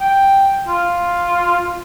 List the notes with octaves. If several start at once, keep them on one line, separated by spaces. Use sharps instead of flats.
G5
F4